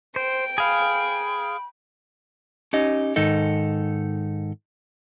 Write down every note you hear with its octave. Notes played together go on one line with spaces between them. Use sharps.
C5 G5 D7
G#4 F5 B5
C#4 D#4 G4 D#5
G#2 D#3 D#4 A4 D#5